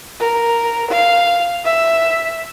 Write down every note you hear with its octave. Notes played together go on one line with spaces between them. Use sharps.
A#4
F5
E5